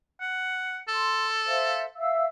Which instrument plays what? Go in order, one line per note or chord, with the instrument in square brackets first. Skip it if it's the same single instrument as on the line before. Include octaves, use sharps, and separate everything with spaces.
[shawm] F#5
[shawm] A4 [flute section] C6
[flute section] C5 E5 F5
E5 F5 E6